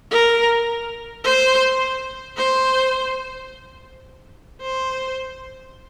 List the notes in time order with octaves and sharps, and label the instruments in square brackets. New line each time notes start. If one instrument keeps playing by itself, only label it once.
[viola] A#4
C5
C5
C5